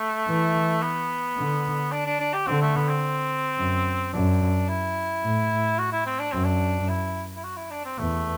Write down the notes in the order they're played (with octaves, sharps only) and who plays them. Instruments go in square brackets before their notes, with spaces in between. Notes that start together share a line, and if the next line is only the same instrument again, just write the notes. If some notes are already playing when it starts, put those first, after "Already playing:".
Already playing: [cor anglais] A3
[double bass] E3
[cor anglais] B3
[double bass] D3
[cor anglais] D4
D4
D4
G4
[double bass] D3 [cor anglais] C4
[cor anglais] A3
B3
C4
[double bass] F#2
[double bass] F#2 [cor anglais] D4
[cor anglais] E4
[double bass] A2
[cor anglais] F#4
E4
C4
D4
[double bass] F#2 [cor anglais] C4
[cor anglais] D4
E4
E4
F#4
E4
D4
C4
[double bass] E2 [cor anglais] A3